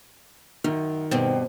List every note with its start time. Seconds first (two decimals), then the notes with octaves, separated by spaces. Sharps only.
0.64 F#2 D#3
1.11 G2 B2 C4